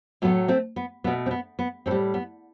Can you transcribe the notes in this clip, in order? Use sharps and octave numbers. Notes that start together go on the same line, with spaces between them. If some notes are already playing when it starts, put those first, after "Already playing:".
A2 F#3 A3 B3
A3 C4
B3
B2 A3 B3
C4
B3
B3
A2 A3 C4
G3
B3